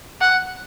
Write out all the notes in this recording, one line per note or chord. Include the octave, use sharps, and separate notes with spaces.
F#5